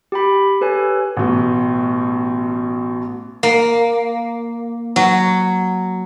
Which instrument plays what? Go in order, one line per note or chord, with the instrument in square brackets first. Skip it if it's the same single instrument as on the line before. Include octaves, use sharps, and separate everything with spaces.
[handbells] G4 G5 B5
G4 A4 B4 C#5 G#5
[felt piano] A1 B2
[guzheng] A#3
F#3